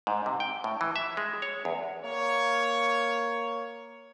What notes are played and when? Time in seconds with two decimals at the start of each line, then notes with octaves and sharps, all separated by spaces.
0.07 G#2
0.26 C3
0.40 G5
0.64 A2
0.81 E3
0.96 E5
1.17 G#3
1.42 C#5
1.65 E2
2.04 A#3 C#5